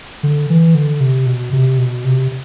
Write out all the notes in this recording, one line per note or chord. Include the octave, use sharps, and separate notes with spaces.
D3
E3
D3
C3
B2
C3
B2
C3